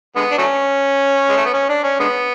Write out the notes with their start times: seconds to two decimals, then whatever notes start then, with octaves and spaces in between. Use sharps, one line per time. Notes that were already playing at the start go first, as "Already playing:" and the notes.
0.16 D3 G#3 B3
0.31 D4
0.38 F#3 A3 C#4
1.29 G#3
1.37 A3
1.45 B3
1.53 C#4
1.69 D4
1.84 C#4
2.00 D3 G#3 B3